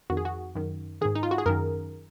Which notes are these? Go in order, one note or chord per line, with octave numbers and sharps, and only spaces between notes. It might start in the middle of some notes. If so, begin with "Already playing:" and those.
F2 D#3 F#4
G#4
F#4
F#2 D#3
G#2 D#3 G#4
D#4
F4
F#4
G#4
F#2 D#3 A#4